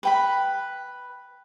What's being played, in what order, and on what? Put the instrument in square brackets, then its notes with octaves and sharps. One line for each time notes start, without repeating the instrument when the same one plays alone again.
[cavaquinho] B4 G5 B5